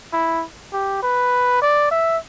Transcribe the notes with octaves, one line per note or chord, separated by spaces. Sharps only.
E4
G4
B4
D5
E5